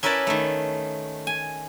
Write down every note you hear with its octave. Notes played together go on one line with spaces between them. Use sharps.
C#4 E4 A#4 B4 D5 A5
D#3 A3
G#5